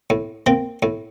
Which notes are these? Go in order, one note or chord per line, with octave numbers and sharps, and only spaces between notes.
A2
A#3 C4
A2